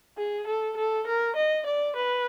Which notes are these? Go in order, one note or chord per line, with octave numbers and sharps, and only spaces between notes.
G#4
A4
A4
A#4
D#5
D5
B4